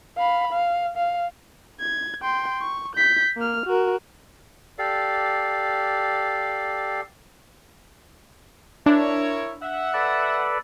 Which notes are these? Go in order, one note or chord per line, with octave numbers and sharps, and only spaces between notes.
F5 B5
F5
F5
G#6
G5 C6
C#6
G6 B6
A#3 F6
F#4 A#4
G4 A4 D5 F5
D4 E4 A#4 C#5
E5 F#5
A4 B4 D5